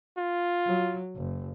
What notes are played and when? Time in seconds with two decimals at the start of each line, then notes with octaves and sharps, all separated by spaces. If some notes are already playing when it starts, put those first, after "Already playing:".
0.17 F4
0.67 F#3
1.16 F#1